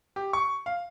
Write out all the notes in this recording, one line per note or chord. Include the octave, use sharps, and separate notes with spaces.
G4
C#6
F5